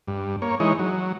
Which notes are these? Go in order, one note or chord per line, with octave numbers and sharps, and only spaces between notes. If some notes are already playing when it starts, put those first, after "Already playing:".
G2
A#3 C#5
E3 G#3 D#4 C#5
F#3